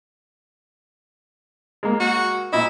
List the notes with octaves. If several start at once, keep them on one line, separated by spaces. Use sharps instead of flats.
G#3 A#3
F#4
A#2 E4 D#5